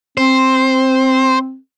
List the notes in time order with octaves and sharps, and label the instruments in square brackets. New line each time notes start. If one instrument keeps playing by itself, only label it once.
[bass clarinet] C4 [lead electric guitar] C5